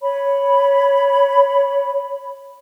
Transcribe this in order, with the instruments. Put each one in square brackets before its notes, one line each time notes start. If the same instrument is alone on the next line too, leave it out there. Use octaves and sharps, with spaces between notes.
[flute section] C#5 B5